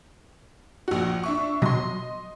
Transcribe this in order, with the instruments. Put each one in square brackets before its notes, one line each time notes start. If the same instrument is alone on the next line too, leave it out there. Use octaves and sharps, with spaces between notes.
[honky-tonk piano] A#1 F#4
D4 E5 C#6
[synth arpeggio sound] B2 F#3 [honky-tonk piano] D#5 C6